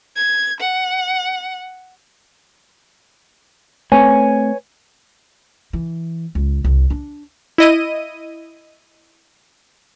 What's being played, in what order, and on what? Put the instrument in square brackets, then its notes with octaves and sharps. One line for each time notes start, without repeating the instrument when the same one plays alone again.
[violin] G#6
F#5
[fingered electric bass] A3 C4 [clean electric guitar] B4 C#5 G#5
[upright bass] E3
C#2
C2
D4
[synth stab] E4 D#5 D#7